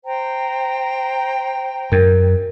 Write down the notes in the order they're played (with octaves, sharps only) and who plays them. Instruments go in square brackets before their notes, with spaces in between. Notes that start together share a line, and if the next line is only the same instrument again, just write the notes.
[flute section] C5 G5 A#5
[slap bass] F#2 [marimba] A#4